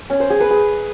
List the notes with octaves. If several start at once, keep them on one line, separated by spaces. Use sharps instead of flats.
C#4
C5
G#4
B4
G#4